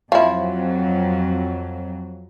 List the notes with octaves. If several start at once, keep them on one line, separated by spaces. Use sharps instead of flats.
F2 F3 F#3 E4